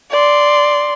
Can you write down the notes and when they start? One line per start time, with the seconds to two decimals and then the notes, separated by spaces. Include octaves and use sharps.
0.11 D5 C6